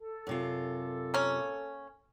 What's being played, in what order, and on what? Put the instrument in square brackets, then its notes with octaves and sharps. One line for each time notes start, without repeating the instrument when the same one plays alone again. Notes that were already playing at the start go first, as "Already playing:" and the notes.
[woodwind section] A4
[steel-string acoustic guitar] F#2 C3 F4
[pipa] A#3 C#4